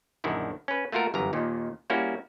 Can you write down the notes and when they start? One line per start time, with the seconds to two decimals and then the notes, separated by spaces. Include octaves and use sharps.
0.24 A#1 F#2 D3 D#3 E4
0.68 C#4 B4
0.92 A3 A#3 F4 F#4 A#4
1.14 G1 F#2 E3 A#5
1.33 D#2 A#2 D#3
1.90 G3 A#3 C#4 E4 F#4